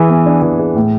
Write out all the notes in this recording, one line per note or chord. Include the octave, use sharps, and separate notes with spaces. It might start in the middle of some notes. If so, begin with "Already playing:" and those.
Already playing: E3 G#4
B3
D4
E3
G#4
A2